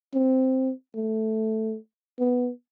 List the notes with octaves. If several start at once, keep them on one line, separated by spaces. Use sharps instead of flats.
C4
A3
B3